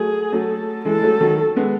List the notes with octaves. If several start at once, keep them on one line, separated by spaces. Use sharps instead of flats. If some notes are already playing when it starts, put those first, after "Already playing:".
Already playing: F#3 A3 G#4
F#3 A3 A4
E3 G#3 A4
G#3
F#3 A3
D#3 F#3
G#3 B3